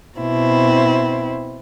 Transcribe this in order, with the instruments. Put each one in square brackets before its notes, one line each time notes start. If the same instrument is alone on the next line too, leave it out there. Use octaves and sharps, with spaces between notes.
[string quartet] B2 C4 E4